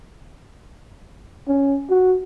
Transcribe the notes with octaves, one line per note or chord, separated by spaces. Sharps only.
C#4
F#4